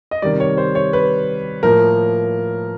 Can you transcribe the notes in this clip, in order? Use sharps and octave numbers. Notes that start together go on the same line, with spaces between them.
D#5
C3 D#3 G3 D5
C#5
C5
C#5
B4
A2 F3 A#3 A#4